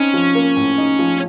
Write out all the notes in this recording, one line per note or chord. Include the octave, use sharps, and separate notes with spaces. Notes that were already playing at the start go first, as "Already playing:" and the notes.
Already playing: C4 C#4 D#4
F3
A#3
A2
D#4
F3